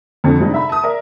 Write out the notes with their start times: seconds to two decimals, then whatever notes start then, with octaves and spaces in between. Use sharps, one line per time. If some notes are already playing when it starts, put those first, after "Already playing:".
0.24 F2 D3
0.39 C3 G3 G#3 D4 D#4
0.54 E5 A#5 B5
0.69 A5 D#6
0.83 A#4 D5 E5